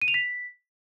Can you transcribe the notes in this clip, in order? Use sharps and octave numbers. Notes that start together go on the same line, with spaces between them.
D#7
F7
B6